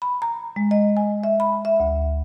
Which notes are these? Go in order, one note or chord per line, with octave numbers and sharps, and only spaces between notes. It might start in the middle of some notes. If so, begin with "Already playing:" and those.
B5
A#5
G#3
D#5
G#5
E5
B5
E5
D2